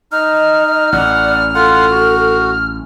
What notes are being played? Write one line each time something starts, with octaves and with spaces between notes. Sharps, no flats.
D#4 D#5 F6
A1 D5 F#5
F4 A4 F#5
F#4